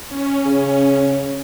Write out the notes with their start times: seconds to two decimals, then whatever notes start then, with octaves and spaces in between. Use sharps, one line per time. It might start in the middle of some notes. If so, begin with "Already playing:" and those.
0.11 C#4
0.45 C#3